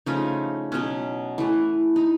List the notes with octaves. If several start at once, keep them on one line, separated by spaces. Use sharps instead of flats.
C#3 F3 A3 C#4 D#4
B2 F#3 B3 C#4
E3 A3
D#4